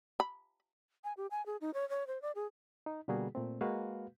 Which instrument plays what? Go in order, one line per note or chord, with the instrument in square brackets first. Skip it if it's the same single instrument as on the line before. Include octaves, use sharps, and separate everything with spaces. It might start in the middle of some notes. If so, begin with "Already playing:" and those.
[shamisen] B5
[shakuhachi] G#5
G4
G#5
G#4
D#4
C#5
C#5
C5
D5
G#4
[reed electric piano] D#4
B2 D3 G3 A#3 F#4 G#4
A#2 A3 C4
G#3 A#3 F#4 B4 F5